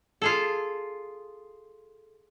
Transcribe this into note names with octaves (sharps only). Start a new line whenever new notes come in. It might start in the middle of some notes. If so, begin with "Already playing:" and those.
F4 G#4 A4